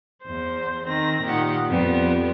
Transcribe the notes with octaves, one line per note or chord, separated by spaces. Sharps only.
E2 C5
D#3 C4 A#6
A#2 D#3 G4 F#5
F2 G3 B3